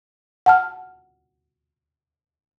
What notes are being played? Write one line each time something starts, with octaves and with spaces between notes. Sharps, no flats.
F#5 A5 F6